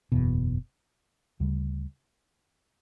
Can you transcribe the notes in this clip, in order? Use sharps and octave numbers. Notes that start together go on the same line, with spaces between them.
F#1 E2 B2
D2 C#3 G3